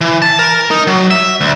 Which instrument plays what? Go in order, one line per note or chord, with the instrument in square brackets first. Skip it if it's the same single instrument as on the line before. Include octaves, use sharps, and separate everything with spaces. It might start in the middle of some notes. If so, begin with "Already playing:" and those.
[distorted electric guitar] E3
A5
A#4
D#4
F#3
E5
D2